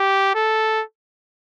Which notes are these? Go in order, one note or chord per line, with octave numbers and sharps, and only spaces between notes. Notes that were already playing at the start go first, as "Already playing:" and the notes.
Already playing: G4
A4